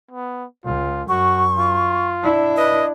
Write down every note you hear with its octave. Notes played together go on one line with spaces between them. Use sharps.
B3
C#2 F4
F#2 F#4 C#6
F4
D4 E4
B4 D#5